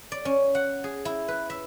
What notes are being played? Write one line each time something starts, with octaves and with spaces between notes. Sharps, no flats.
D5
C#4
F#5
G#4
E4
B4
E5